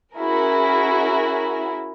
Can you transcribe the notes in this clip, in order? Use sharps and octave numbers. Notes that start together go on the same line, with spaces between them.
C#4 E4 F#4 G#4 A#4